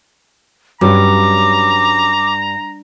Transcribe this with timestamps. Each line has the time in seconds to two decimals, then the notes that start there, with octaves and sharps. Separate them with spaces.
0.81 G2 F#3 G3 C#4 A#5 D6